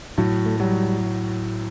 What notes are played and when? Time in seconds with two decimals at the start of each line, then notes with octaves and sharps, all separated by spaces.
0.18 A2 F#3
0.46 A3
0.60 F#3 G3